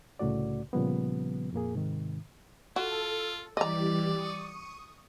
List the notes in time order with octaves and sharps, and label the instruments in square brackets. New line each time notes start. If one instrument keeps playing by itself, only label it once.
[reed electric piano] C2 A2 C#3 A3 F#4 D5
A#2 C#3 F3 G3 B3
F2 A#2 A#3 G#4
G#2 C3 D#3
[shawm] F4 [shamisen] F#4 [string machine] A4
[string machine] E3 G3 G4 [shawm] D5 [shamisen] D#5 A#5
[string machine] C#6 D#6